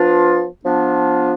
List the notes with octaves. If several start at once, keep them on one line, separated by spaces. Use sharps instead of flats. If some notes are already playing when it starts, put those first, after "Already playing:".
Already playing: F3 B3 D4 F4
F3 B3 D4 F4